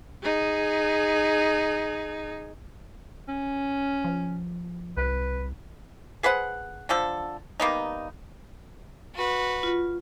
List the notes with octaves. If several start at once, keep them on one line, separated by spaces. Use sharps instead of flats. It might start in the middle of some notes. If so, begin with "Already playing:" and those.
D#4 G#4
C#4
F3
C2 B4
G#4 B4 C5 F#5
D3 F3 A4
G3 A#3 B3 D#4
F#4 B4
F4